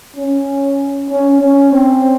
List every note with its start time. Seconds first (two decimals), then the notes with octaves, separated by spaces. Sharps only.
0.16 C#4
1.10 C#4
1.41 C#4
1.73 C4